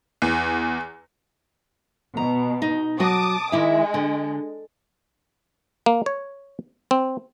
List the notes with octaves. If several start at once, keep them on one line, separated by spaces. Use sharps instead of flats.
E2
B2 A#5
D#4
F#3 F#4 A5 D6 D#6
D#3 G#3 E4 E5
D3
A#3
C#5
C4